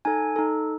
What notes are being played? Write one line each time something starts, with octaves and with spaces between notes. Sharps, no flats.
D#4 A4 G#5
D#4 A4